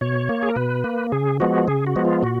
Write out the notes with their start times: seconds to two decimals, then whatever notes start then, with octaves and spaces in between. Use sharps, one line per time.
0.01 B2 C#5
0.29 A#3
0.43 G#4
0.49 A#4
0.56 B2 B4
0.84 A#3
1.12 C#3 G#4
1.40 F3 G#3 B3 F#4
1.68 C#3 G#4
1.87 F#4
1.96 F3 G#3 B3
2.05 F4
2.23 A#2 F#4